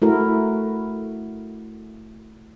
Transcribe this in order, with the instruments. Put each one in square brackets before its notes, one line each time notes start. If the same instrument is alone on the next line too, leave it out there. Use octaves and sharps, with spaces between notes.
[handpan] A3 E4 F#4 A#4